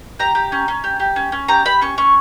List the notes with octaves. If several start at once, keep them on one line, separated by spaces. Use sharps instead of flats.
G4 A#5
G4
C#4
C#4
G4
G4
C#4
C#4
G4 A#5
G4 B5
C#4 C#6
C#4 C#6